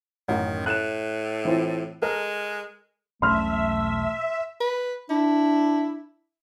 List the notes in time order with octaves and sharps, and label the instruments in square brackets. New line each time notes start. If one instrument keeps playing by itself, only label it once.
[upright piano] A1 F#2 [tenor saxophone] D#3
[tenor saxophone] A2 [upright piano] F#6 E7
[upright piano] E3 C4 F4
[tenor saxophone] G#3 [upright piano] A4 A#4
[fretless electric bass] E1 B1 C#4 [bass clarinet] A3 [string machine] E5 [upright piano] C6 F6
[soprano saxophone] B4
[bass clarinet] D4 [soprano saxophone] E4